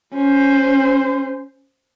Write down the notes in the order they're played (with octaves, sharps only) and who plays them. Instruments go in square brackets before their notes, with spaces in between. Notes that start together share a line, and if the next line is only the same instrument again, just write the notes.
[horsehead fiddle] C#4 C5